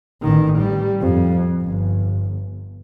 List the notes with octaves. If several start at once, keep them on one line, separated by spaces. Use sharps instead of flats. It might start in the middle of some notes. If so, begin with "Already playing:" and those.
A1 D#3
G3
F2
G1